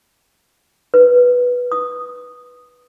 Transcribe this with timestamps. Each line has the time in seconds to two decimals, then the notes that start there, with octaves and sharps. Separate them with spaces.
0.94 B4
1.72 D#6